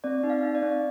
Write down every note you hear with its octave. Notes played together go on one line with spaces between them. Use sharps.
C4 D5
D#4
F5
D#4
D5
C4